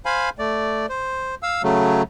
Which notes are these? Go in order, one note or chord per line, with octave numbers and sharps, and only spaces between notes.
C5 F5 G#5 B5
A3 D5
C5
F5 E6
C#3 F#3 A3